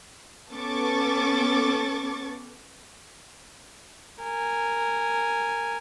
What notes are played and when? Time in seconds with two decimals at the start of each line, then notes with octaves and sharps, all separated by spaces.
0.52 B3 C#4 A4 C#6 D6 A6
4.23 A#4 G#5